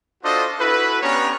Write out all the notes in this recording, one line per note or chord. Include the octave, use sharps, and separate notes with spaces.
D4 F4 F#4 A4 C5 D#5
E4 F#4 A4 B4
B3 C#4 D4 G4 C#5 A#5